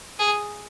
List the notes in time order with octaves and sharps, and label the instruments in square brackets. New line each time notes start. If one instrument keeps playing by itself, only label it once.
[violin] G#4